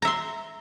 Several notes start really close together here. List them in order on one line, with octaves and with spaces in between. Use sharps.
A#5 E5 C6